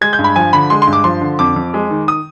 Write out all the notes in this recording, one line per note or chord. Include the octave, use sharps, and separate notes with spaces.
G#3 G#6
G6
G2
B5
F3 G#5
D3 B5
G#3 C6
C6
G2
D6
F3 C6
D3
F2 D6
F2
G#3
D#3
D#6